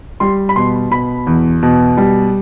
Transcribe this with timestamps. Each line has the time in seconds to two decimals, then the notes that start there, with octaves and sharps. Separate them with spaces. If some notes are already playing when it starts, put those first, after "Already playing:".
0.20 G3 C6
0.49 B5
0.56 B2 C6
0.91 B2 B5
1.27 E2
1.63 B2
1.97 G3